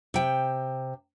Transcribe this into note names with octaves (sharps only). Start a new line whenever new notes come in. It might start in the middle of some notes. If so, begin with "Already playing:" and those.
C3 G5